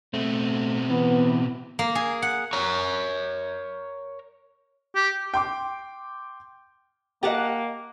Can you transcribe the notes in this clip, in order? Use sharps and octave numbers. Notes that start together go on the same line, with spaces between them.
B2 A3 C4
E3 B3
A#3
G#4
F#5
A#4 C#5 A#5
G4
G5 C6 D6
A#3 G4 D#5 F#5 A5 A#5